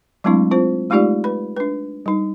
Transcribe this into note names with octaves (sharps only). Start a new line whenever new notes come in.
F#3 G#3 A3 C4 D4 E4
C4 F4 C5
G#3 A3 D#4 F4 G4 D5
B4 B5
D4 B4
G3 D#4